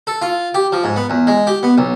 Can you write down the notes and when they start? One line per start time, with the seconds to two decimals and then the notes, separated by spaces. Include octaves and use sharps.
0.07 A4
0.22 F4
0.54 G4
0.72 F3
0.84 G#2
0.96 B3
1.10 E2
1.27 G#3
1.47 G4
1.63 B3
1.78 B1